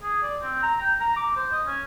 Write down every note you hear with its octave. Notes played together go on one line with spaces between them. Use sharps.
G#4
D5
C4
A#5
G5
A#5
D6
C5
D#5
C#4